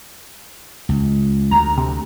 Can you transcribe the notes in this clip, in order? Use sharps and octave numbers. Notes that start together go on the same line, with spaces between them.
C#2
D2 A#5
C3